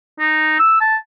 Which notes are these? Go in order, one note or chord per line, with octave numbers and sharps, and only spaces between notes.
D#4
E6
A5